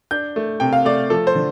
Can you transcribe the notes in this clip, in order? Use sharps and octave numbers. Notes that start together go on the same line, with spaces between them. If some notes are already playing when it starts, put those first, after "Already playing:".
D4 G6
A3
C3 G5
F5
A3 D5
F3 A4
C5
D3